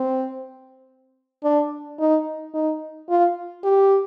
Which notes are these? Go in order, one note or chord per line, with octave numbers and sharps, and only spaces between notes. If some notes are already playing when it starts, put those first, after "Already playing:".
Already playing: C4
D4
D#4
D#4
F4
G4